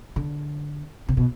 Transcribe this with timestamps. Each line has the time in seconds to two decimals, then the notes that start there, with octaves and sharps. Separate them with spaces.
0.16 D3
1.08 C3
1.17 B2